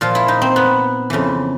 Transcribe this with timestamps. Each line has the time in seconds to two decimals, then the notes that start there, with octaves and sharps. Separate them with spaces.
0.01 A#2 F3 F4
0.15 E4
0.28 D#4
0.42 C4
0.56 B3
1.10 F2 C#3 E3